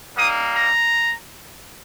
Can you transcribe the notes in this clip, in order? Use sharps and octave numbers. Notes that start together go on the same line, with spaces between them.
G3 A#3 D#4 D#6
A#5